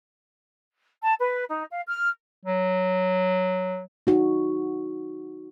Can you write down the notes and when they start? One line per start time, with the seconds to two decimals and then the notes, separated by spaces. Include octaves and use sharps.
1.03 A5
1.20 B4
1.49 D#4
1.70 F5
1.86 F6
2.45 F#3
4.07 D#4 F#4